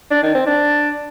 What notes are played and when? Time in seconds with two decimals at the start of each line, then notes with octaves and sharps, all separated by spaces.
0.11 D4
0.23 D#3
0.35 C4
0.47 D4